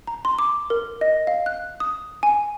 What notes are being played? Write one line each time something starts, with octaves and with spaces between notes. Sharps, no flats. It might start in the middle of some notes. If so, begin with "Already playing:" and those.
A#5
C6
D6
A#4
D#5
F5
F#6
D#6
G#5